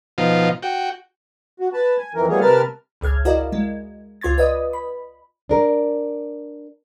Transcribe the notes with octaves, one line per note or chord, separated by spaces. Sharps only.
B2 F3 D#4 F4
F#4 G5
F#4
B4 A5
G#5
F2 E3 A#4
F3 G3 A3 B3 G#4 C#5
C3 A#4 B4 A5 F6
G#1 C#2 G#4 F6 G#6
E4 F#4 A#4 D5 D#5 F5
G#3
C#2 F4 C6 G#6 A6
B4 D5 D#5 D#6
B5
D4 A#4